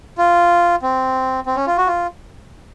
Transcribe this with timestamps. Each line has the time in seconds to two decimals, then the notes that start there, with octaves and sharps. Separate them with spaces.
0.18 F4
0.82 C4
1.46 C4
1.56 C#4
1.67 F4
1.78 F#4
1.87 F4